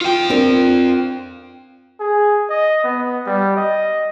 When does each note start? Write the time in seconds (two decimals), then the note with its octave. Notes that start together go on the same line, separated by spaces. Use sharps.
0.01 F4 G5
0.30 C4 D4 A#4
2.00 G#4
2.50 D#5
2.84 B3
3.26 G3
3.56 D#5